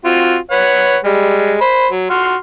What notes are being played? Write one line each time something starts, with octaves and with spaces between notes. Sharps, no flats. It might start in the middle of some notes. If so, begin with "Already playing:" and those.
C4 F4 F#4
B4 C#5 F#5
G3 G#3
C5 B5
F#3
F#4 C6 F6